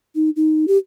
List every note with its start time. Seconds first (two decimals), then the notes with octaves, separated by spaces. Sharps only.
0.15 D#4
0.36 D#4
0.68 G4